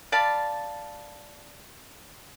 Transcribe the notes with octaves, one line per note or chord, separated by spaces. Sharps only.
D5 F5 A5 B5